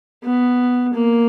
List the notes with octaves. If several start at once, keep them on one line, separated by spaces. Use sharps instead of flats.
B3
A#3